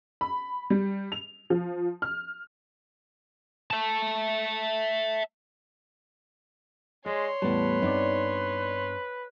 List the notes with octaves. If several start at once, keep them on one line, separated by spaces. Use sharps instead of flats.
B5
G3
F7
F3
F6
E5 A5
G#3 C#5 D5 C6
E2 A2 G3 B3 B4 A5
G2 B3 C4 D#4 D5